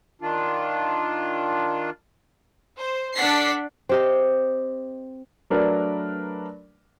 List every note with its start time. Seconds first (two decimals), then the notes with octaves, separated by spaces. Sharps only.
0.22 D#3 D4 F4
2.76 C5
3.16 D4 A4 D5 F#5 B6 C7
3.89 C4 G4 D#5
5.50 F#3 A3 D4 A#4 B4 D5